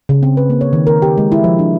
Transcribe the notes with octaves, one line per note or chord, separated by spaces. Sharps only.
C#3
C4
B4
A#3
C#5
D#3
A#4
G4
G#3
E4
F3
D4